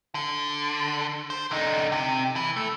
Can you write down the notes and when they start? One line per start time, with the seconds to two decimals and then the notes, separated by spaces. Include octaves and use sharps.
0.15 D3
1.30 C5
1.51 D3 D#4
1.92 C3
2.36 E3
2.56 A3